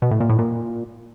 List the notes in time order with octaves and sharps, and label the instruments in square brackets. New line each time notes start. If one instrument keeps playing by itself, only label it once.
[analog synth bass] B2
A2
A#2
A2
A#2